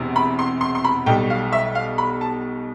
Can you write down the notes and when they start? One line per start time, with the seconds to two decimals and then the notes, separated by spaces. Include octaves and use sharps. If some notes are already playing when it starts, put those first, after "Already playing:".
Already playing: E1 E2 C3
0.16 B5
0.39 C6
0.61 C6
0.75 C6
0.84 B5
1.06 B1 B2 G3 G5
1.30 F5
1.52 E5
1.75 F5
1.98 B5
2.21 A5